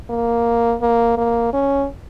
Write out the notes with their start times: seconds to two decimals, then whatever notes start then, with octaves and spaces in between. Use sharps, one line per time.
0.10 A#3
0.82 A#3
1.18 A#3
1.53 C#4